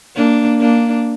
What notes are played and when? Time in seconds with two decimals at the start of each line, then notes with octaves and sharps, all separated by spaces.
0.16 A#3 D4
0.60 A#3 D4